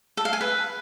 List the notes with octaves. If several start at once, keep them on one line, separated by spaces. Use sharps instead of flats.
A4
F5
G#5
B4